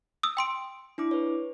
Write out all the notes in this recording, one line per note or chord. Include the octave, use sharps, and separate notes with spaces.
D#6 E6
G5 C6 D7
D4 E4 D6
B4 C#5